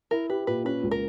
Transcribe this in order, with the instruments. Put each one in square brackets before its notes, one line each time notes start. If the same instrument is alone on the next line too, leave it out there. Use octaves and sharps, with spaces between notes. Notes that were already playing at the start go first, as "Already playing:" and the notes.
[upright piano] E4 [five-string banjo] A#4
[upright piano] G4 [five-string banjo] B4
[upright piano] A#2 [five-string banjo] B4
[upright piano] C#4 [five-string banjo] B4
[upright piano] C#2
[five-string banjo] A#4